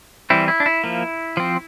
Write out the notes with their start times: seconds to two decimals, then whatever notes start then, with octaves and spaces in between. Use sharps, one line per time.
0.30 E3 G3 C4 E4
0.48 E4
0.60 D4
0.66 E4
0.84 F3 A#3
1.37 F3 C4